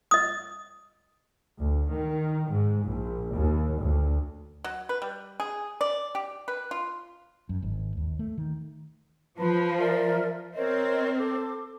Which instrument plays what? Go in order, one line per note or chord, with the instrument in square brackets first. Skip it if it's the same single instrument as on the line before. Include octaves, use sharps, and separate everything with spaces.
[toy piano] D#5 D#6
[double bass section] D2
D#3
G#2
A#1
D#2
D2
[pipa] F#3
B4
G3
G#4
D5
G4
B4
F4
[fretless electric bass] F#2
G#1
D#2
A3
D#3
[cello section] F3 [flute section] B4 A5 B5
[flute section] A#4 D5 E5
[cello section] C4 [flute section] A#4 C#5 D#5
[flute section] A4 D6